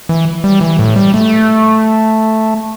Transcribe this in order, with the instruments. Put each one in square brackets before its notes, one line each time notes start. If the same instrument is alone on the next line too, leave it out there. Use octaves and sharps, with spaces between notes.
[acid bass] E3
G3
E3
A2
G3
A3